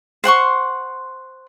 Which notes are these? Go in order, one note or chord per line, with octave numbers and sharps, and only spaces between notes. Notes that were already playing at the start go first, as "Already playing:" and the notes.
C5 F#5 C6 C#6